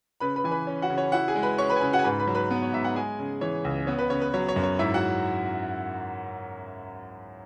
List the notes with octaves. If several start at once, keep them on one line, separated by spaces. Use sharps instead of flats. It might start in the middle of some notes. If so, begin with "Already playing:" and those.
C#3 B4 B5
B4 B5
E3 G#5
B4 B5
C#4
F#4 F#5
C#3
C#5
E4 F#4 F#5
G#4 G#5
G#3
B4 B5
C#4 C#5 C#6
B4 B5
G#5
C#3 B4 B5
F#4 F#5
G#5
G#2 B4 B5
B4 B5
F#3
B4 B5
B3
C#5
G#2 E5
F#5
G#3 G#4 G#5
C#3
E3 C#5
C#2
B3 C#5
B4
C#3 C#5
B4
F#3 C#5
C#5
F#2
C#5
G#2 E4 E5
F#4 F#5